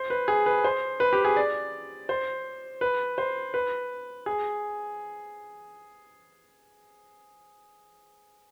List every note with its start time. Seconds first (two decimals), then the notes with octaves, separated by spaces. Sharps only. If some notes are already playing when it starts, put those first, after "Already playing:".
Already playing: C5
0.10 B4
0.28 G#4
0.46 B4
0.64 C5
1.00 B4
1.13 G4
1.25 G#4
1.36 D5
2.09 C5
2.81 B4
3.18 C5
3.54 B4
4.26 G#4